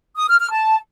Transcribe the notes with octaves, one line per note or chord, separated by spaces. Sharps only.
D#6
F6
F6
A5